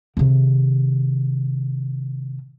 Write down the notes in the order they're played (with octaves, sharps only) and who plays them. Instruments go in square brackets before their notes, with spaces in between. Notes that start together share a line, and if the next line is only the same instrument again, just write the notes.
[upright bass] C3 D#3